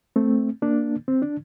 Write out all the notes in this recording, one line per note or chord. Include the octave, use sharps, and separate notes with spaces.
A3 C4
A#3 D4
C4
D4